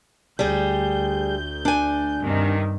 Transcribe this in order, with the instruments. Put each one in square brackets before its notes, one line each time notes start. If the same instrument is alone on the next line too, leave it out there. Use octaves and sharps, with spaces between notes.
[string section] D2 G6 [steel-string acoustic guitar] G3 G#4
[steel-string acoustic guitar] D4 G#5
[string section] G2 C3 D#3